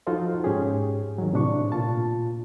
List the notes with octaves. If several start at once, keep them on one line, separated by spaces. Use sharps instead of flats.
F3 D#4 F4 F#4 A4 C5
G#2 C#4 G4 G#4
D#3 F#3
A2 C3 D4 C#6
A#2 F4 A5